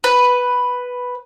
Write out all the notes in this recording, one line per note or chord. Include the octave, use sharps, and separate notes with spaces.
B4